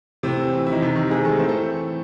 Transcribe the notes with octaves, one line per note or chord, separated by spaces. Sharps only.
A2 C3 C4
E3
A2
E3 E4
D#3 D#4
C3
D#3
C3 G#3 G#4
D#3 A3 A4
A2 C4 C5
A3 A4
E3